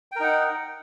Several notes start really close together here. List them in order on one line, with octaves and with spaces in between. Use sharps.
G5 A#4 D#4 F#5